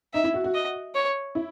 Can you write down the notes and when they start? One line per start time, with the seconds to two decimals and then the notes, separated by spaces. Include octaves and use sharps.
0.14 D#4 E5
0.24 E4
0.34 F#4
0.44 F#4
0.54 D#5
0.95 C#5
1.35 E4